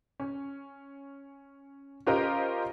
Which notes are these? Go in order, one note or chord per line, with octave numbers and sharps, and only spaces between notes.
C#4
C#4 F4 G4 A#4 C5 D#5